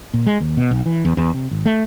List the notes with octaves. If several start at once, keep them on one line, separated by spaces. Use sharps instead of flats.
A#2
G#3
D#2
B2
B1
E3
E2
E2
C3
G#1
A3